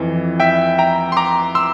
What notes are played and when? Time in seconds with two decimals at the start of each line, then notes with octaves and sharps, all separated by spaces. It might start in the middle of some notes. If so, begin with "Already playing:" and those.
Already playing: F2 E3
0.40 E5 G5
0.78 G5 A#5
1.12 C6
1.17 A#5 D6
1.55 C6 E6